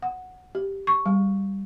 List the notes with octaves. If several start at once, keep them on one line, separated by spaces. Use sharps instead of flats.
F#5
G4
C#6
G3